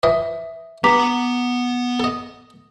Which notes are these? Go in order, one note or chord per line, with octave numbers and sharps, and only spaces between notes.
E3 F3 D#5 E5
G2 B3 F#5 A#5 D6 B6
A4 D#5